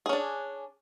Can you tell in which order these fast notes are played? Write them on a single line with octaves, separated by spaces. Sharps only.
G#4 C#4 D4